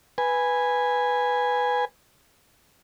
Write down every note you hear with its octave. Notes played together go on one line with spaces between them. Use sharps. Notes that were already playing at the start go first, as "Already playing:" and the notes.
B4 G#5